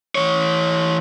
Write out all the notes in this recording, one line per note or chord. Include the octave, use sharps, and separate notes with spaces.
E3 C#5